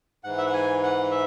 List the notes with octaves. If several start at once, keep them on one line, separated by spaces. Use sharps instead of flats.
G#2 E3 F#5
E5
F#5
G#5
F#5
E5